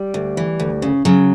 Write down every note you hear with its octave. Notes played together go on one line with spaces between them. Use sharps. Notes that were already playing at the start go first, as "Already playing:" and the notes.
Already playing: G3
D2
E3
D2
C#3
C#3 F#3